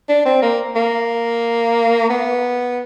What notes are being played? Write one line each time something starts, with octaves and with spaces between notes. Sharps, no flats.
D4
C4
A#3
A#3
B3